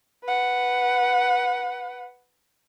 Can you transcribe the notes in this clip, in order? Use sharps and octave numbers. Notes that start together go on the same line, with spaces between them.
B4 F#5